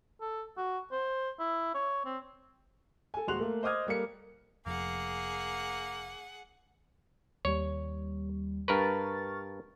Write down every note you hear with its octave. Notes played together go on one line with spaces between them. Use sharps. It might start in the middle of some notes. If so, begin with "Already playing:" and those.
A4
F#4
C5
E4
C#5
C4
A4 G#5
D#1 G#3 F#4 C6 F#6 F7
A3 A#3
C5 D#5 D6 D#6 F6 G#6
G3 A#3 A4 C#7
F1 F2 A#3 G#4 F#5
D#2 G3 C#5
G2 A#4 B4 C#6 F6 A6